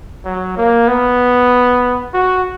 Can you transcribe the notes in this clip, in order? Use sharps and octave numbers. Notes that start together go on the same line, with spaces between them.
F#3
A#3
B3
F#4